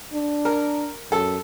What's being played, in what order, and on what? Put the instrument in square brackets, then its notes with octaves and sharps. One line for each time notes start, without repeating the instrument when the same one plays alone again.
[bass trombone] D4
[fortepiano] A#4
[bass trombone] F#2 [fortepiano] A4